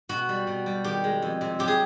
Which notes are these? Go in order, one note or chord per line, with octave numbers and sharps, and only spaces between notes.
B2 F#4
G3
B2
G3
D#3 G4
G#3
F2
C3
F#3 G4
G#4